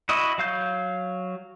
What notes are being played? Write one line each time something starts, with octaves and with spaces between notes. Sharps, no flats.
E4 F#4 D#5
F#3 F5 G6